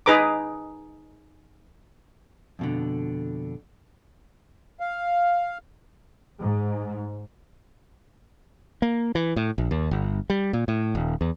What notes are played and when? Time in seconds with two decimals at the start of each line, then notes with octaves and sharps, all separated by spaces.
0.06 D#4 G#4 B4 A#5 D6
2.59 F2 B2 D3
4.80 F5
6.39 G#2
8.82 A#3
9.15 E3
9.36 A2
9.58 A#1
9.71 D#2
9.91 G1
10.30 G3
10.53 A#2
10.68 A2
10.95 D#1
11.21 E2